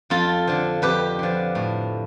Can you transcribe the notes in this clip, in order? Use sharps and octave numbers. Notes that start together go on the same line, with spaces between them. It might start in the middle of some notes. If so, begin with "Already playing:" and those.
F2 F4 A4
D3 F3
F2 G4 B4
D3 F3
A2